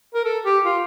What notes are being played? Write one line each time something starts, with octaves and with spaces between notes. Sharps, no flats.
A#4
A4
G4
F4